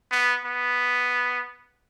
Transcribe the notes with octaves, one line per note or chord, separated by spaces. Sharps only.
B3
B3